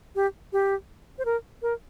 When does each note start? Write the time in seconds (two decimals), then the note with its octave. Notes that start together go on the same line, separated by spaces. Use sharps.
0.16 G4
0.53 G4
1.19 C5
1.25 A#4
1.62 A#4